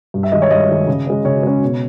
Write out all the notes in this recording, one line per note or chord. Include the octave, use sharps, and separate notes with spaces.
G2
E5
D#3 G#3 D#5
C#5
G2 D#5
D#3 G#3
C#3
G#3 C#4
C#3 C#5
G#3 C#4
B2